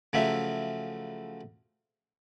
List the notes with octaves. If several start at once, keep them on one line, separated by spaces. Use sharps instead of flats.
C#3 F3 F#3 A3 E5